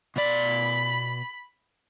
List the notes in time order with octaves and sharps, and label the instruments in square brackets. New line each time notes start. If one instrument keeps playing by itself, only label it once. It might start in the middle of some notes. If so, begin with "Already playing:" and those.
[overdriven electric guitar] B2 D5 [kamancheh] B5